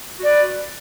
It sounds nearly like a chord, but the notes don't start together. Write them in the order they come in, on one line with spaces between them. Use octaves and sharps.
F#4 D5 B4